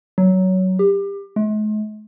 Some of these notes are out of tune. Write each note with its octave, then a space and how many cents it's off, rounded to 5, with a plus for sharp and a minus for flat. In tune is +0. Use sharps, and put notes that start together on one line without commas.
F#3 +15
G4 +25
G#3 +45